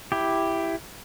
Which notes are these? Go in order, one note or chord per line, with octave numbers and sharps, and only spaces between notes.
E4 G4